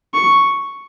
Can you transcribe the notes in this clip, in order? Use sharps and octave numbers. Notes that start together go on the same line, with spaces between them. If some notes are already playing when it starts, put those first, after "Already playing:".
C#6